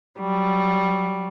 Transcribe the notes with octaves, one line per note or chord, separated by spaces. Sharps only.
F#3 G3